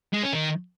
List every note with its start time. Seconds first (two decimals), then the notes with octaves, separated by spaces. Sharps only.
0.13 G#3
0.23 C#4
0.33 D#3